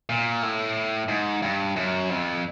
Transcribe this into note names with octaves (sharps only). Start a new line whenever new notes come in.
A#2
A2
G#2
G2
F#2
F2